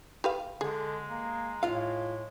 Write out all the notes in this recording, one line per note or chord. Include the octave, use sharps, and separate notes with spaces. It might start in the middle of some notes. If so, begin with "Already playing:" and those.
G4 B4 F5
D3 G#3 G#4
A#3
A2 F4 F5